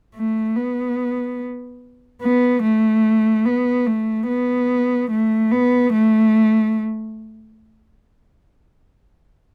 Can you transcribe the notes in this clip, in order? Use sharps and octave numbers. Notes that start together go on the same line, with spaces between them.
A3
B3
B3
A3
B3
A3
B3
A3
B3
A3